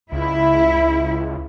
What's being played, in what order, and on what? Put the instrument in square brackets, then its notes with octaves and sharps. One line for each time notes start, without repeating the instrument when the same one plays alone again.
[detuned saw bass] C#2 [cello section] E4